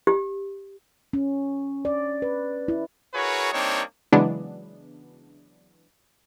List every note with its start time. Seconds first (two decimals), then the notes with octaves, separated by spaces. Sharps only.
0.07 G4
1.13 C#4
1.85 D5
2.22 B4
2.68 E4
3.14 E4 F#4 G#4 A#4 B4 C#5
3.52 G3 A#3 C4 D4 D#4 C#5
4.12 C#3 E3 F#3 G#3 B3 D4